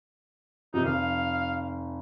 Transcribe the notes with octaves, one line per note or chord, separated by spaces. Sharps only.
C3 F3 D#4
F1 F5